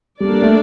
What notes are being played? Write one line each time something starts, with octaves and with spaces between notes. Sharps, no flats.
G3 A#3 D4 A4 D5
G3
A3